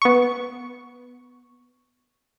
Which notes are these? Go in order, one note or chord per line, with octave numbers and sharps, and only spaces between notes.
B3 C#6